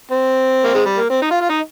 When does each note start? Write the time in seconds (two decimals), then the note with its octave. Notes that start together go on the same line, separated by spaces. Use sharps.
0.11 C4
0.64 A#3
0.74 G#3
0.85 G3
0.97 A#3
1.10 C4
1.22 D#4
1.31 F4
1.41 F4
1.50 D#4